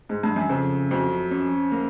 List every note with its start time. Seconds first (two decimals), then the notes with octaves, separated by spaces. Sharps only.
0.09 G#2
0.23 G2
0.36 F#2
0.49 F2 C#3
0.91 F2 F#3
1.31 C#4
1.72 A#3